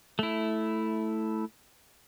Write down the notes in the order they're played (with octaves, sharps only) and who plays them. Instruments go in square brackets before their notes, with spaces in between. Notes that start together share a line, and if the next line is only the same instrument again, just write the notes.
[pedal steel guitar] A3 E4